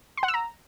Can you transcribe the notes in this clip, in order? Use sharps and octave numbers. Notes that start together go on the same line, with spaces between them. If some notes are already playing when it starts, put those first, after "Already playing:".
C6
F#5
E6
A#5